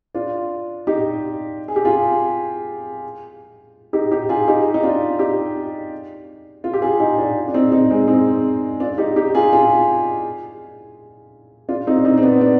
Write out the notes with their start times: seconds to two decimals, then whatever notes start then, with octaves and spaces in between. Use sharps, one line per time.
0.14 D4 F4
0.87 D#4 G4
1.68 G#4
1.76 G4
1.85 F4 G#4
3.93 D#4 G4
4.11 D#4 G4
4.29 F4 G#4
4.48 D#4 G4
4.74 D#4
4.83 D4 F4
5.19 D#4 G4
6.64 F4
6.73 G4
6.82 F4 G#4
7.00 D#4 G4
7.18 D4 F4
7.48 D4
7.54 C4 D#4
7.72 C4 D#4
7.90 G#3 C4
8.08 C4 D#4
8.80 D4 F4
8.98 D#4 G4
9.16 D#4 G4
9.35 F4 G#4
9.53 F4 G#4
11.69 D4 F4
11.87 C4 D#4
11.98 D4
12.05 C4 D#4
12.18 C4
12.23 B3 D4
12.41 B3 D4